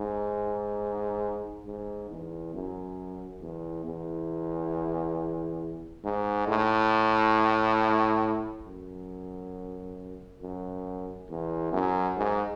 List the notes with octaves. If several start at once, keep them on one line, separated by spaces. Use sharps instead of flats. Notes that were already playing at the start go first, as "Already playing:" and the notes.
Already playing: G#2
G#2
E2
F#2
E2
E2
G#2
A2
F#2
F#2
E2
F#2
G#2